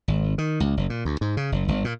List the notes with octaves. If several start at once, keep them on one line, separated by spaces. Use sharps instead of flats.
G#1
D#3
C#2
F#1
A#2
D2
G#2
C#3
F#1
G1
A#2